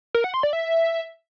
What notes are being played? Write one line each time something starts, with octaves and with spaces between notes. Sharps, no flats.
A#4
F#5
C6
D5
E5